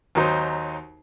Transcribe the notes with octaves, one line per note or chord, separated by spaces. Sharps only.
D#2 F#3 D#4 C5